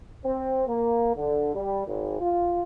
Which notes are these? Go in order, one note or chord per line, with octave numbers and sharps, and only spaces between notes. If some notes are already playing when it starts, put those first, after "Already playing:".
C4
A#3
D3
G3
G#1
F4